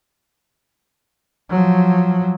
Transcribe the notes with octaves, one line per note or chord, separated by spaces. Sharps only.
F3 F#3